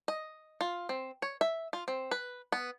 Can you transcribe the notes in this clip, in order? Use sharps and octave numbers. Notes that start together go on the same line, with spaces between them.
D#5
F4
C4
C#5
E5
F4
C4
B4
B3